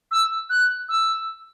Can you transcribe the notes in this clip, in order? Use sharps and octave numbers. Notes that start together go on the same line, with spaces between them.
E6
F#6
E6